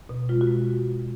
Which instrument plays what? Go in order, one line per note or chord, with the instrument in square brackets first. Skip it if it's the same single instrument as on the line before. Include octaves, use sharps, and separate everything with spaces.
[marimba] B2
G#3 F4
F#4
G#3